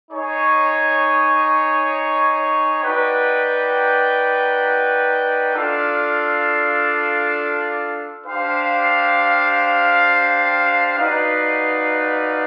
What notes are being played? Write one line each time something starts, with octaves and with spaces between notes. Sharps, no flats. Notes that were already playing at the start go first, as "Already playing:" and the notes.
D#4 G#4 C#5
D#4 F#4 B4 D5 G5
D4 F4 A4 D5 F5
D4 G4 C5 F5
D#4 F#4 B4 D5 F5